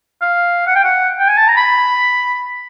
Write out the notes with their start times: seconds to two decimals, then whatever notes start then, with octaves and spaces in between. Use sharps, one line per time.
0.22 F5
0.67 F#5
0.76 G5
0.84 F#5
1.19 G5
1.28 G#5
1.37 A5
1.48 A#5
1.57 B5